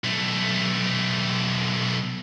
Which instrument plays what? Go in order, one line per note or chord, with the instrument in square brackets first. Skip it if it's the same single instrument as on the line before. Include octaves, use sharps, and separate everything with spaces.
[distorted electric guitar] B1 A3